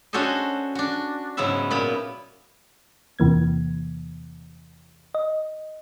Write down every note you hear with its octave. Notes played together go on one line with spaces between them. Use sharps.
C#4 D4 F#4 A4 C5 D#5
D4 F#4
G#2 C#3 F#3 B3 E4 E5
A#2 B3 B5
E2 C3 E3 A#3 G#6
D#5